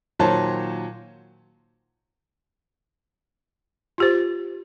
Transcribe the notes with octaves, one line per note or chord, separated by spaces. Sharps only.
A#2 D#3 F#3 C5 C#5 A5
F4 G4 C5